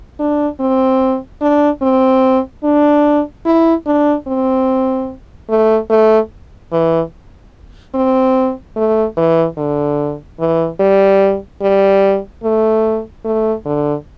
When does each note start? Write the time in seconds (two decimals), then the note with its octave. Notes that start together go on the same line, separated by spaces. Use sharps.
0.19 D4
0.60 C4
1.41 D4
1.82 C4
2.64 D4
3.46 E4
3.86 D4
4.27 C4
5.50 A3
5.90 A3
6.72 E3
7.95 C4
8.76 A3
9.17 E3
9.58 D3
10.40 E3
10.80 G3
11.61 G3
12.43 A3
13.25 A3
13.66 D3